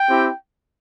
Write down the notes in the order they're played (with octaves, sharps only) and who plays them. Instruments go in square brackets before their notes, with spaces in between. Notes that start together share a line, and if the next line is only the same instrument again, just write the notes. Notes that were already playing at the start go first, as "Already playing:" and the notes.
Already playing: [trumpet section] G5
C4 E4 G4